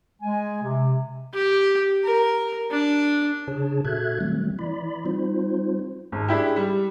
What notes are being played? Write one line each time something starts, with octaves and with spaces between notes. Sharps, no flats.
G#3 G#5
C3
G4
A#4
D4
C#3 D4 G#4 C#5 A5
A#2 F#4 A4 E5 F#6 G#6
D#3 F#3 G3 A3 C4
E3 E4 D5 B5
G3 C4 D#4 F4 C5
G#1
G#3 D4 E4 G4
G3